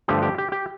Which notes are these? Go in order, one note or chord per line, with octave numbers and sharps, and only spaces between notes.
G2 D3 F3 A3 D4 G4
G4
G4
G4